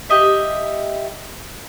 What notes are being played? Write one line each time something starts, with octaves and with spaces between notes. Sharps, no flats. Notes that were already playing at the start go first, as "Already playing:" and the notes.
G4 D#5 E5